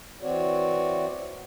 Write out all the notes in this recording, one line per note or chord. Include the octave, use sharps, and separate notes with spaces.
E3 C4 F#4 C#5 D5